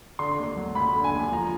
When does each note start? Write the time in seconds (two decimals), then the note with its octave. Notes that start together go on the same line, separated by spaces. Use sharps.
0.19 D3 C6
0.39 D#2
0.57 F#3
0.75 D#2 B5
0.95 D3
1.04 G#5
1.13 D#2
1.32 F3 A#5